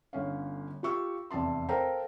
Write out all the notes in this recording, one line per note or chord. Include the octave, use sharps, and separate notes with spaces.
G1 D3 C#4 C#5 F5
F4 G4 C#6 E6
F1 E2 D5 A5 C6
A4 A#4 C5 F5 G5 A#5